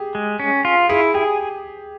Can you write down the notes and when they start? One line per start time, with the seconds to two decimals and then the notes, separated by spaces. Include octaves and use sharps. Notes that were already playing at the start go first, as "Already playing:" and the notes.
Already playing: G4 G#4
0.15 G#3
0.40 C#4
0.65 F4
0.89 E4 G#4
1.14 G4 G#4